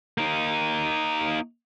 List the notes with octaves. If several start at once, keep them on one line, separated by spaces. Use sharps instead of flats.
A#3 D#4